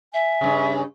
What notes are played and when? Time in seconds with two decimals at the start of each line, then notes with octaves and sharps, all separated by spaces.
0.14 E5 G#5
0.41 G2 C#3